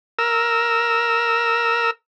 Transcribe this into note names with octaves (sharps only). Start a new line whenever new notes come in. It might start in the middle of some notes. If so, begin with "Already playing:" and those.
A#4 E6